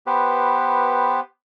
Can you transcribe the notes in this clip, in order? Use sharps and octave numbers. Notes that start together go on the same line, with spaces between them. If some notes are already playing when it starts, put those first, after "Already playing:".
B3 G4 B4 C5